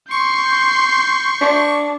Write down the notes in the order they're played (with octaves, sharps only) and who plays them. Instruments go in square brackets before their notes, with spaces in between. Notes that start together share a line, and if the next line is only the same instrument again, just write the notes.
[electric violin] C6 G6 [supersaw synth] C#6
[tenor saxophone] D4